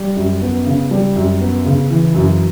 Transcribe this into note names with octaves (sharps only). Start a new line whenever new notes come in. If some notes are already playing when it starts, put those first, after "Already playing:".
Already playing: G3
F#2
B3
C#3
G3
F#2
B3
C#3
E3
F#2